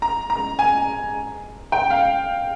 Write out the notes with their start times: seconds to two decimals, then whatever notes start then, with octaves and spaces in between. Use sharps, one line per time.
0.02 A#5
0.30 A#5
0.59 G#5
1.72 G5
1.90 F5